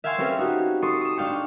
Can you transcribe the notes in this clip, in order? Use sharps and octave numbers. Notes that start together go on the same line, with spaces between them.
E5 F5 G5 G#5 C6 C#6
C4 C#4 G4 A4 B4
D#4 F#4 G4
A4 C6 C#6 D#6
D#6 E7
D4 D#4 F5 G5 C#6